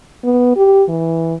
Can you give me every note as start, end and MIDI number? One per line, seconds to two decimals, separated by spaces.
0.24 0.53 59
0.57 0.83 67
0.89 1.35 52